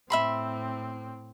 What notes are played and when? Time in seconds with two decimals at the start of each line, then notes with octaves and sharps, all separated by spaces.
0.10 A2 C4 E5 B5 C6